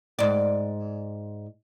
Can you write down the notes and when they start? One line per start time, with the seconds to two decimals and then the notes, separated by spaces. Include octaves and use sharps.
0.19 G#2 D5